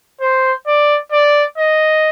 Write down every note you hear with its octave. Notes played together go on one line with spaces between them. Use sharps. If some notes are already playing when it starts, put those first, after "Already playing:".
C5
D5
D5
D#5